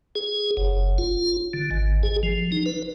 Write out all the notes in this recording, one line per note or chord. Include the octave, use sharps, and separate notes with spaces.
G#4
F#1
F4
D3
G#1
G#4
F3
D#4
B4